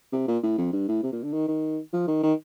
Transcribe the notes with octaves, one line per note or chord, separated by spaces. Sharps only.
C3
A#2
A2
F2
G2
A2
C3
A#2
D3
D#3
D#3
F3
D#3
D#3